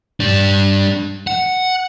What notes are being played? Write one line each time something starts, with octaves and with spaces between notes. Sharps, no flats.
G3 D4
F#5